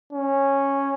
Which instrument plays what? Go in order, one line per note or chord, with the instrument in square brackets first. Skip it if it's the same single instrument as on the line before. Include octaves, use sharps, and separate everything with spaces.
[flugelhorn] C#4